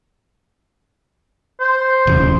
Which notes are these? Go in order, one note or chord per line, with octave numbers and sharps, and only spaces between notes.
C5
D1 E2 C#3